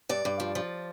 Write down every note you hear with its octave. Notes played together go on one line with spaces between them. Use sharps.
G2 D5
G2
F3
F3